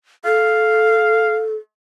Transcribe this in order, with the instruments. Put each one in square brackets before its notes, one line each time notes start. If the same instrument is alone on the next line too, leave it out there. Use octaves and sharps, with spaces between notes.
[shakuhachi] A4 [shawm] F5